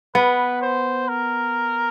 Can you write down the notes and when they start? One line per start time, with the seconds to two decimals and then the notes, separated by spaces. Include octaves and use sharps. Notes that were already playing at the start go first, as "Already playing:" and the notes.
0.15 B3 B4
0.62 C5
1.08 A#4